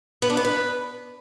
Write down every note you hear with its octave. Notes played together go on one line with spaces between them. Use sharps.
B3
D4
B3
B4